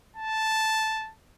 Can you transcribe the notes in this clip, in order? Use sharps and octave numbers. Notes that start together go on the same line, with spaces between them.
A5